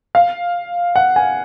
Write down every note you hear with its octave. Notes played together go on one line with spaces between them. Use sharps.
F5
F#5
G#5